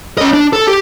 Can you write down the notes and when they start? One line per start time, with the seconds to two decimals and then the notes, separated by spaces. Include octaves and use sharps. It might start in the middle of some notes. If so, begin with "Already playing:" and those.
0.18 C#4 D#5
0.34 D4
0.53 A4
0.67 G4